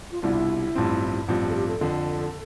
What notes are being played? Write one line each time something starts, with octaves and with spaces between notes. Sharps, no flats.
F4
C2 B2 G3 D4 E4 F4
A1 G2 F3 C4
A1 G2 F3 C4 F4
G4
A4
G4
A4
F2 D3 F3